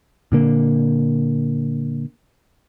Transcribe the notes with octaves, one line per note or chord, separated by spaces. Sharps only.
A#2 D3 A#3